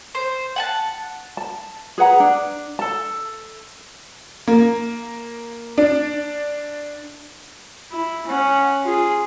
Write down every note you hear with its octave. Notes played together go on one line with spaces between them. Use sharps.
C5
F#5 G#5 A5
A5
G#4 B4 F#5 A#5
D4
A4 A5
A#3
D4
E4
C#4 F#5
F4 G#4